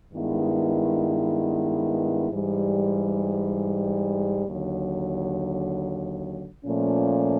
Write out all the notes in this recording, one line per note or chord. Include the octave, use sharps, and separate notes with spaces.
G2 D#3 G#3 B3 E4
G#2 E3 G3
D#2 D3 F#3
A#2 F3 A3 C#4